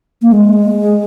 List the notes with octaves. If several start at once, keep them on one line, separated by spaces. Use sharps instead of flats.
A#3
G#3